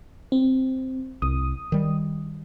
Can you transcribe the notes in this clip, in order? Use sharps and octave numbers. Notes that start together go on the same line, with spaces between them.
C4
C2 D#6
D#3 G3